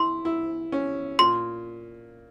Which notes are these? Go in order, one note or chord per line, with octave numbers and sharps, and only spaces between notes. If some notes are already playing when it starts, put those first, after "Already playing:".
Already playing: E4 C6
E4
C#4
A#2 C6